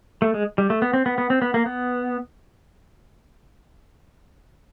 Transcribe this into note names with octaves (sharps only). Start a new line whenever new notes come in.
A3
G#3
G3
A3
B3
C4
B3
B3
C4
B3
A#3
B3